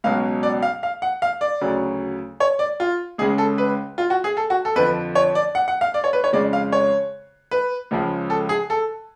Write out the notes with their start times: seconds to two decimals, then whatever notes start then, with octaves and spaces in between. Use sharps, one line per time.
0.04 C#2 B2 F#3 F5
0.43 D5
0.62 F5
0.83 F5
1.02 F#5
1.22 F5
1.41 D5
1.61 D2 C#3 F#3
2.40 C#5
2.59 D5
2.80 F4
3.18 C#2 C#3 G#3 G#4
3.38 A4
3.58 B4
3.98 F4
4.10 F#4
4.24 G#4
4.37 A4
4.50 F#4
4.65 A4
4.76 F2 D3 F3 B4
5.15 C#5
5.35 D5
5.55 F#5
5.68 F#5
5.81 F5
5.94 D5
6.04 C#5
6.13 B4
6.24 C#5
6.33 F2 C#3 G#3 D5
6.53 F5
6.72 C#5
7.51 B4
7.91 C#2 C#3 F3 G#3
8.30 A4
8.49 G#4
8.70 A4